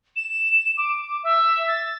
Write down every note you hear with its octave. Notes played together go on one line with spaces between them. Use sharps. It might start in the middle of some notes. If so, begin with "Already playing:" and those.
E7
D6
E5
A6